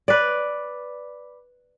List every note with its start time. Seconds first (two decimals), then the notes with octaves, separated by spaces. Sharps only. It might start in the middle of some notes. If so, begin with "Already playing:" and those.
0.08 B4 D5